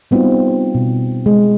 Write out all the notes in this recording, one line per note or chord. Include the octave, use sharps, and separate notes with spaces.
G3 B3 C4 D#4 F4 F#4
B2
G#3